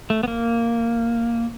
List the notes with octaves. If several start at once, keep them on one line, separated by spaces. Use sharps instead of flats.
A3
B3
A#3